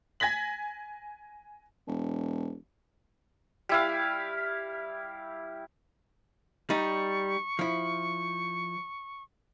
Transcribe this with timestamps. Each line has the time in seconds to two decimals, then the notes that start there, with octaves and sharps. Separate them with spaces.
0.20 G#5 G#6 A#6 B6 F#7
1.88 E1
3.69 G3 E4 F5
6.70 G3 D#4 C#6
7.59 F3 E4